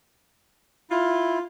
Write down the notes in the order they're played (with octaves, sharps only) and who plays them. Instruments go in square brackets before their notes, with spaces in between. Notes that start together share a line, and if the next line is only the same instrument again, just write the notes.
[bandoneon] E4 [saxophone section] F4